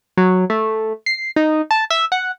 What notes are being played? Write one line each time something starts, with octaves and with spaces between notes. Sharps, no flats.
F#3
A3
C7
D#4
A5
E5
F#5